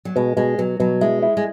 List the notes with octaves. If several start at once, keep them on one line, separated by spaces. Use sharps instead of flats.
F#3
B2 G#3
B2 G#3
B2 F#3
B2 F#3
G#3 E4
E4
G#3